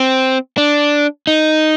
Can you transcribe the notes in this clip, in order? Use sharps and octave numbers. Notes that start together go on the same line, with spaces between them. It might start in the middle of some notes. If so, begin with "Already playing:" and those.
Already playing: C4
D4
D#4